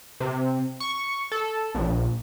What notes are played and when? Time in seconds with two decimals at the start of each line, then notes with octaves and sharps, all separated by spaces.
0.20 C3
0.80 C#6
1.32 A4
1.75 A#1